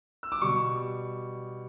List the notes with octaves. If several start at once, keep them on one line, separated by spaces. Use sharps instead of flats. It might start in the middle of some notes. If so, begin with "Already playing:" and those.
E6
D6
B2 G3 C#6